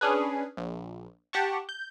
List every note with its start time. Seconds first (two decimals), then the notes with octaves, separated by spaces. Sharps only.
0.01 C#4 D4 G#4 B4
0.57 A#1
1.33 G4 F#5 A5 C#6
1.69 G6